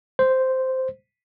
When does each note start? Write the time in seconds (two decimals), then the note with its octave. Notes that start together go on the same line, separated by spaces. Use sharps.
0.19 C5